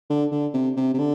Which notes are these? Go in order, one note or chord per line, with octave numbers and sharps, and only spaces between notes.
D3
D3
C3
C3
C3
D3